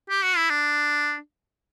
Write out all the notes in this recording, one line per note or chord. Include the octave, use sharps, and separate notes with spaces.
G4
F#4
E4
D4